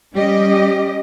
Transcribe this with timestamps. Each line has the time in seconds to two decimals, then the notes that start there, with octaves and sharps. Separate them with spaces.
0.14 G3 C#4 G4 D#5